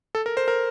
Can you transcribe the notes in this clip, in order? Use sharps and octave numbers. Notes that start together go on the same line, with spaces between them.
A4
A#4
C5
A#4